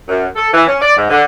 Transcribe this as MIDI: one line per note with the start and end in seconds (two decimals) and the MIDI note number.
0.09 0.26 42
0.36 0.49 69
0.54 0.66 52
0.67 0.76 61
0.81 0.97 74
0.97 1.08 44
1.10 1.23 50